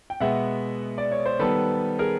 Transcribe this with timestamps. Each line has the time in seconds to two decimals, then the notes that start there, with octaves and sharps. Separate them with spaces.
0.10 G5
0.20 B2 G#3 B3 E5 F#5
0.98 D5
1.12 C#5
1.26 C5
1.39 D#3 G3 B3 A4 B4
1.99 G#4 A#4